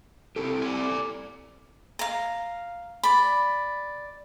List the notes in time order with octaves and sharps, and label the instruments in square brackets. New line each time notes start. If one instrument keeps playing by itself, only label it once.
[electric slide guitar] C4 E4 G4 [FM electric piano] A4
[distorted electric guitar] D5 G#5
[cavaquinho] F5 A#5
D5 B5